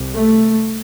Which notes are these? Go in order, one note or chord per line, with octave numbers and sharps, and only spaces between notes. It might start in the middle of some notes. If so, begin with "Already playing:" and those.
Already playing: C2 C3
A3